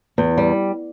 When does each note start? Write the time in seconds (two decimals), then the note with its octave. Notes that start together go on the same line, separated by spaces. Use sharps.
0.18 E2
0.38 G3